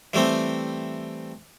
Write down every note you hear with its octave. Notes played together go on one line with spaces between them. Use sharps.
E3 G3 A3 C4